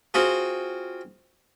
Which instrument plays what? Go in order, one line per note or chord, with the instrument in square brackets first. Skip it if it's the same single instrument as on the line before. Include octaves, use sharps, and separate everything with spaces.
[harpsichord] C4 F4 F#4 G#4